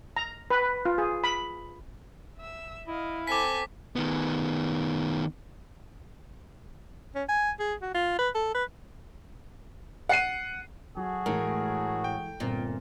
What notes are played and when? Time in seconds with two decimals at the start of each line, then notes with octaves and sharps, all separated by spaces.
0.16 A#5
0.50 B4
0.85 F4
0.98 G#4
1.24 B5
2.38 E5 E6
2.87 E4 D#5 F5
3.27 C4 A4 G#5 D6 B6
3.96 D#3 B3
7.15 C#4
7.29 G#5
7.60 G#4
7.82 F#4
7.94 F4
8.19 B4
8.35 A4
8.55 B4
10.09 F#5 C7 D#7
10.97 F#3 F#4 G#4 A4
11.26 A2 E3 G#3 A#4
12.04 G5
12.40 G1 A#2 C4